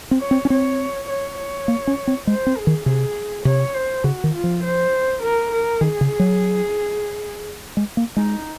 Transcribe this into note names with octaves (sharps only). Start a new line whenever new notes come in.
C4
C#5
C4
C#4
C4 C#5
C#5
C#5
A#3
C#4
C4
G#3 C5
C4
G#4
D#3
C3 G#4
C3 C#5
C5
C#3 F#4
D#3
F4
F3
C5
A#4
A#4
D#3 G#4
C#3
F#3
G#3
A#3
G#3 D#4